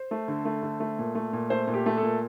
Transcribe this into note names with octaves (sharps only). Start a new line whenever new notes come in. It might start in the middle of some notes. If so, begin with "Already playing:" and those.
Already playing: C5
A3
D3
A3
D3
A3
A#2
A3
A#2
A3 C5
A#2
G4
A3
A4
A#2